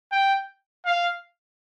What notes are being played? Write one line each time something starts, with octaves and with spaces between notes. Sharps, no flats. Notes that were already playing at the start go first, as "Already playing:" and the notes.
G5
F5